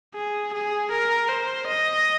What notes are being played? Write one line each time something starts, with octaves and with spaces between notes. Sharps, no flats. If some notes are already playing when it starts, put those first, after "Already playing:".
G#4
G#4
A#4
C5
D#5